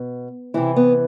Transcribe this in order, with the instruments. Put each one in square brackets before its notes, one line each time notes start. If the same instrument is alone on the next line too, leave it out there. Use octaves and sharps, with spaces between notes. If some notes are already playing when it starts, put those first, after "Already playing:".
Already playing: [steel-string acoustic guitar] B2
C3 E3 E4
B3